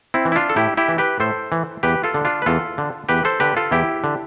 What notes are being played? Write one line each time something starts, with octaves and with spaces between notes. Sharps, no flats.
C4 E4
E3
E4
D4 F4
A4
A2 E4 G4
E4 G4
E3
G4 B4
A2 A4 C5
E3
E2 G4 B4
F4 A4
D3
D4 F4
B4
E2 F4 A4
D3
E2 G4 B4
A4 C5
D3 G4 B4
F4 A4
E2 E4 G4
D3